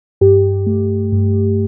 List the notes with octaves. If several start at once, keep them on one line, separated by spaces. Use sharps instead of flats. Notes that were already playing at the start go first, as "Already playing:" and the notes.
G2 G4
A3
G2